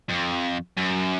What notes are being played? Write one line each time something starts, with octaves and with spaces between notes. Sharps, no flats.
F2
F#2